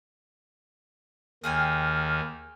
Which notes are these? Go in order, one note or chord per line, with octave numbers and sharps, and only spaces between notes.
D#2 D#3 G#4 G5 G#5 F6